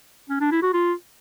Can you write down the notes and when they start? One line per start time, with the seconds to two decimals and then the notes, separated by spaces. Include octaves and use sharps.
0.29 C#4
0.40 D4
0.51 E4
0.62 F#4
0.74 F4